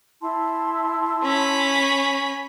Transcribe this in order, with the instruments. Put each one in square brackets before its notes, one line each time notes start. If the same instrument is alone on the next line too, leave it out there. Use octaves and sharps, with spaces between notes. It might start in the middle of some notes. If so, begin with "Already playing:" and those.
[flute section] E4 A5 C6
[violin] C#4 B5